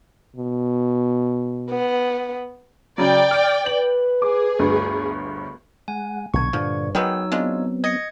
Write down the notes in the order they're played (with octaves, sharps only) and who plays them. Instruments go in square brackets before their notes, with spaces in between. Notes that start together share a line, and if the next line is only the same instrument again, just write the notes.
[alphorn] B2
[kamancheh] B3
[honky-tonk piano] C#3 F#3 [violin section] D5 G5
[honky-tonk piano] F6 D7
[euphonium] B4 [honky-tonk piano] F#7
[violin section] G#4 [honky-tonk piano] D6
[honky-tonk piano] G1 D2 G2
[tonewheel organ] G#3 F#5 [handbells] G#5
[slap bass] B1 D3 [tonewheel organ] A#2 [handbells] C#6 G#6
[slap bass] G2 D3 [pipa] F3
[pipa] D#3 G#3 B3 [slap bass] F#3 [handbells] D#4 C#5 E6 [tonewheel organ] G5
[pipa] G#3 D4 F4 [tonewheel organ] B3 C4
[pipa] D#5 [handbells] G#6 A#6 C#7